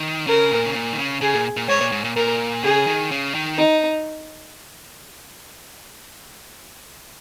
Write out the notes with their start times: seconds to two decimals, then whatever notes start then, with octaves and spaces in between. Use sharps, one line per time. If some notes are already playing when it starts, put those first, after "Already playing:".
Already playing: D#3
0.27 C#3 A#4
0.51 A#2
0.66 C#3
0.74 A#2
0.93 D#3
0.98 C#3
1.21 C#3 G#4
1.34 A#2
1.57 A#2
1.69 G#2 C#5
1.81 A#2
1.92 G#2
2.04 A#2
2.16 A#2 A#4
2.63 C#3 G#4
2.87 D#3
3.11 C#3
3.35 D#3
3.58 D#4